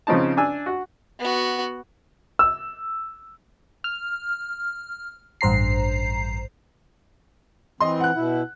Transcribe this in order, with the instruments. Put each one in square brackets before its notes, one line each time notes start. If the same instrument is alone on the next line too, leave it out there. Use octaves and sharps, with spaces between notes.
[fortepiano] C#3 F3 C4 C#4 D#4 A5
D4 G#5 E6
F#4
[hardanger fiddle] B3 F#4
[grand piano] E6
[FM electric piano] F6
A1 G2 C5 A#5 C7
[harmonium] E3 C4 [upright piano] D#5 C6
[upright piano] F#5 F#6
[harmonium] B2 E4